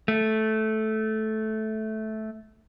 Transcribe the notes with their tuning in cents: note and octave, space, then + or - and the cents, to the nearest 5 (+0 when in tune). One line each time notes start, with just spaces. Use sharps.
A3 -10